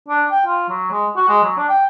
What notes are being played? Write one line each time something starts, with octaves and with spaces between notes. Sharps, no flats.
D4
G5
F4
F#3
G#3
F#4
G#3
F#3
D4
G5